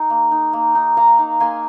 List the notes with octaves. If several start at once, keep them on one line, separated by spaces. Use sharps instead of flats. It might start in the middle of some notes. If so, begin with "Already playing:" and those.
Already playing: D#4 G#4
A#3
D#4
A#3
D#4
A#3 F5 A#5
D#4
A#3 G#5 C6